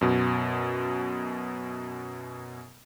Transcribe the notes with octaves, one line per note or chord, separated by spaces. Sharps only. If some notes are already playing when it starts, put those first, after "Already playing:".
F#2 B2